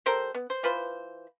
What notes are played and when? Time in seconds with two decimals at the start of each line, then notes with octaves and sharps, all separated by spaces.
0.06 G3 A4 A#4 C5
0.34 B3
0.50 C5
0.63 E3 F4 B4 C5